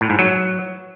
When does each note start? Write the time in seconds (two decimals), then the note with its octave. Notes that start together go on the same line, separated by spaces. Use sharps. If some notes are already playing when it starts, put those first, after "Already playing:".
0.01 A2
0.10 G#2
0.19 F#3